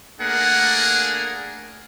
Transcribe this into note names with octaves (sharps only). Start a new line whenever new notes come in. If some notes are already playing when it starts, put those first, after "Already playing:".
A3 A#3 D4 G#4 A#4 F#5